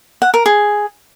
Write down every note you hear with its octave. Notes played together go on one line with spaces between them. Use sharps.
F#5
A#4
G#4